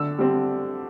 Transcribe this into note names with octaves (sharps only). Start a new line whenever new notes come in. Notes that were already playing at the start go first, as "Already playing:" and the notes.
Already playing: D3 E6
G3 C4